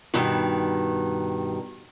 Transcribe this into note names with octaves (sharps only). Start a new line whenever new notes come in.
G2 B2 D#3